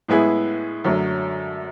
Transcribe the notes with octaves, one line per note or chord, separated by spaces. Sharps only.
A2 G#3 B3 E4 G#4
F#2 D3 F#3 A3